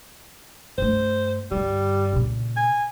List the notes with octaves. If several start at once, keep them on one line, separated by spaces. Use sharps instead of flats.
G2 A3 C5
G2 D3 G3
A#2 C#3
G#5